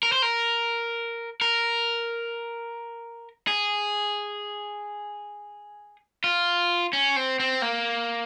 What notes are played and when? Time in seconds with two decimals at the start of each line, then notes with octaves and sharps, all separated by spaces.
0.03 A#4
0.12 C5
0.22 A#4
1.41 A#4
3.47 G#4
6.24 F4
6.93 C#4
7.16 C4
7.40 C4
7.62 A#3